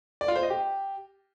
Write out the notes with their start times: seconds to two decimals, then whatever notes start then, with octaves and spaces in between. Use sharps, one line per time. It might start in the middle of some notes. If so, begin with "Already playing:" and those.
0.21 D5
0.28 F4
0.36 C5
0.43 D#5
0.50 G4